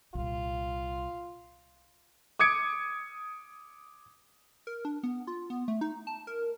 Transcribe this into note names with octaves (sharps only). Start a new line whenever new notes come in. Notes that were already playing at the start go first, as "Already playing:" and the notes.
C2 A#2 F4
D6 D#6 G#6 C#7 D7
A#4
D4
B3
F4
B3
A3
D#4
A5
A#4